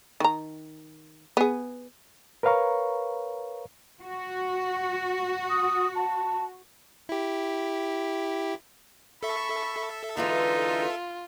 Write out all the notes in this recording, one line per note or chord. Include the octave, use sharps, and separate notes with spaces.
D#3 A#5
B3 G#4
A#4 B4 C#5 F5 A#5 C#6
F#4
D#6
A5
E4 G4
A4 E5 B5 C#6
D3 E3 G#3 D#4 F4